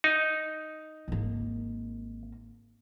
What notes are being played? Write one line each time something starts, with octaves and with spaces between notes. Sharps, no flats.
D#4
G#1 A#3